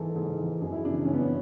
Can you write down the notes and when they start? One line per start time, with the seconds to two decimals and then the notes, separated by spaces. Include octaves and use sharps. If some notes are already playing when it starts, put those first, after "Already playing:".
Already playing: G#2 E3 A4
0.16 G#2
0.39 E3
0.61 F#2 G#4
0.72 E4
0.84 C#3 D4
0.89 E3
0.95 D4
1.05 F#2 C#4
1.14 B3
1.23 C#4